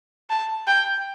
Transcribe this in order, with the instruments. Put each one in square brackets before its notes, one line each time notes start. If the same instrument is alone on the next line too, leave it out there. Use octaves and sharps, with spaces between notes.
[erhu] A5
G5